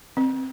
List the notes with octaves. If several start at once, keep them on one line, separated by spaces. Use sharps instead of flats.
C4